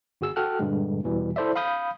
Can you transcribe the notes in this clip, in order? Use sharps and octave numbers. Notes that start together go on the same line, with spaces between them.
G1 F#4 G#4 E6
F#4 A4 G5 F6 F#6
G2 A#2 D3 G#3
E2 B2 E3 G3
E4 A4 C5 D5 E5
F5 B5 D#6 G6